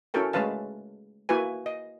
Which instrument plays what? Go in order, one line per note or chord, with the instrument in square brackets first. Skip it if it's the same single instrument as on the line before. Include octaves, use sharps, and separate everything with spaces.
[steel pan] C#4 E4 F#4 A4 A#4 G5
G#3 A3 C#4 B4 F5 A5
A#3 E4 F#4 B4 G#5
D#5